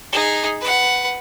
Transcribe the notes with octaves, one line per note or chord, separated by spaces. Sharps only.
D#4 G#4
B4 F#5